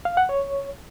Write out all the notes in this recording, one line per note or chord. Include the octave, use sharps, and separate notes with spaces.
F5
F#5
C#5